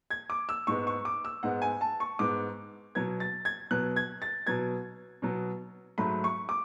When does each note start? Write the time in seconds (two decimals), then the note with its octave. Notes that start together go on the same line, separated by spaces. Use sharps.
0.11 G#6
0.30 D6
0.49 E6
0.67 G#2 G#3 B3 C#6
0.87 C#6
1.05 D6
1.25 E6
1.43 G#2 G#3 B3 F#5
1.62 G#5
1.81 A5
2.00 C#6
2.19 G#2 G#3 B3 D6
2.95 B2 F#3 B3 G#6
3.20 A6
3.45 G#6
3.71 B2 F#3 B3 F#6
3.96 G#6
4.22 A6
4.47 B2 F#3 B3 G#6
5.22 B2 F#3 B3
5.98 G#2 F#3 A3 B5
6.24 C#6
6.49 D6